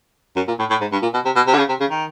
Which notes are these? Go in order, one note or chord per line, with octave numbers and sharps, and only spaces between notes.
F#2
A#2
A2
A2
G#2
G2
A#2
B2
C3
B2
C3
D3
C#3
C3
C#3
D#3